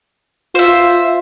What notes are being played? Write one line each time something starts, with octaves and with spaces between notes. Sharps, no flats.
F4 C5 E5